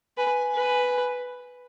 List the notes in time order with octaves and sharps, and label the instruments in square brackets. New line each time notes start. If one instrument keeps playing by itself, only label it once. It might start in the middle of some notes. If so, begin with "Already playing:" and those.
[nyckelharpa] B4 [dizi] G#5
[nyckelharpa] B4